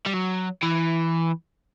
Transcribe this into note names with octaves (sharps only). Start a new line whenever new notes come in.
G3
F#3
E3